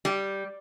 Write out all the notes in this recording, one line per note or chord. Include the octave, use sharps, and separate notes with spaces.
G3